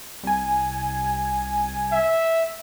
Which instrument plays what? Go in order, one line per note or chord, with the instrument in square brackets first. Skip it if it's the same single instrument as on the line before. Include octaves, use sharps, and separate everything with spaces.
[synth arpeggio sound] C2 G#5
[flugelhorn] E5